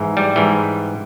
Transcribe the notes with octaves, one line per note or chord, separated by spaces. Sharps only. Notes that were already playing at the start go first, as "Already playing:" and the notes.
Already playing: G#2 E3
G3
G#2 E3